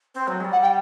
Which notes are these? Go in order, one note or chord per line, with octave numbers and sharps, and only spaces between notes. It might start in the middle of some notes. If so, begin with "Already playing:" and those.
C4
F#3
G#3
G3
F#5
G5